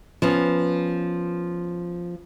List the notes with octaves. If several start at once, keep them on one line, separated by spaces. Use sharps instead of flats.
F3 B3 C#4